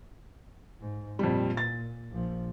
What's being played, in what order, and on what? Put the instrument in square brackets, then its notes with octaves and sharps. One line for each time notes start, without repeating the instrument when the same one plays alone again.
[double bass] G#2
[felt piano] F2 G3 [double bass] A#2
[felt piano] A6
[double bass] A#1 F3